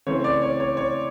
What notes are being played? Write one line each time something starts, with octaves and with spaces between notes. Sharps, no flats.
C#3 E3 A3 C4 C#5
D5
C#5
C#5
C#5